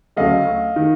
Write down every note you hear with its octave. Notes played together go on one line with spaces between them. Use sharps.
D2 C#3 F#3 A3 D#5 F5
D#3